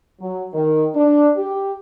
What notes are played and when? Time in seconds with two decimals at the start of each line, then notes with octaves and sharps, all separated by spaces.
0.20 F#3
0.53 D#3
0.94 D4
1.36 G4